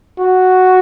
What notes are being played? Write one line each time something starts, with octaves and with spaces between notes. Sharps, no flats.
F#4